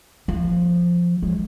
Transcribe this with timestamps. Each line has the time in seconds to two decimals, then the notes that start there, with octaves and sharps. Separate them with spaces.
0.28 F3
1.23 G#3